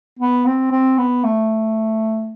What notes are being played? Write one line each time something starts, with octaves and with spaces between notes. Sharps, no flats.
B3
C4
C4
B3
A3